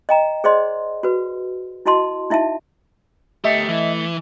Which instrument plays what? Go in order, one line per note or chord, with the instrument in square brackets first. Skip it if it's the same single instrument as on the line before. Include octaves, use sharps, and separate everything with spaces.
[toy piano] D#5 G5 A#5
G#4 C5 D5 D#5 C6
F#4 B4
E4 F#4 D#5 A5 C6
D#4 E4 E5 F5 A5
[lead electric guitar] D2 G4 [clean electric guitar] A3 [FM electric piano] D#5 E5
[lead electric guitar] E3